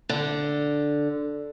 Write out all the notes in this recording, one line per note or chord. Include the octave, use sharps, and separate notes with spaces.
D3